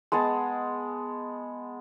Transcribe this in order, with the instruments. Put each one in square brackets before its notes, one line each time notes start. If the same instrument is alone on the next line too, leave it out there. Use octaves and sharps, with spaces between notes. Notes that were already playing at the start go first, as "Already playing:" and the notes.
[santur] G#3 B3 F#5 A5